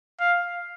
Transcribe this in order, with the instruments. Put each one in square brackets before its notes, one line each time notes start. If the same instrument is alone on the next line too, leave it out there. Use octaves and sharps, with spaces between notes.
[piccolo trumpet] F5